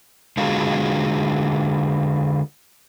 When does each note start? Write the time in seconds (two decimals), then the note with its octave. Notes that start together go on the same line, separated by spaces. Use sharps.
0.37 D3 G#3 F4 F#4 G#4